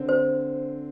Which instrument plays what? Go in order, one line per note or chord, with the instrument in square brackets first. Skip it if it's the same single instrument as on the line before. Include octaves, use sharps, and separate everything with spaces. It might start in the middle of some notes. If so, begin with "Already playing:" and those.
Already playing: [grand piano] D3 C4
[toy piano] C5